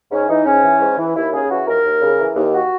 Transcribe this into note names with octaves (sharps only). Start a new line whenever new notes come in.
G#2 C#4
E3 D#4
G#2 C#4
E3
G#2
E3
D#2 E4
C#3 G#4
E3 F#4
D#2 A#4
D#2
C#3
E3
D#2
F#4